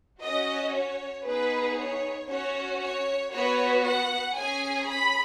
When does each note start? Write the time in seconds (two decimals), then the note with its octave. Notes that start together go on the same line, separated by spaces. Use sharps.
0.22 C#4 F#4 D#5
0.74 C#5
1.26 B3 D#4 G#4 B4
1.77 C#5
2.29 C#4 F#4 C#5
2.81 C#5
3.32 B3 F#4 C#5
3.85 F#5
4.36 C#4 G#4 G#5
4.87 B5